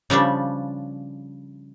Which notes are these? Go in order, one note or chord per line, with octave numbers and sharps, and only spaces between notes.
C#3 F3 G3 D4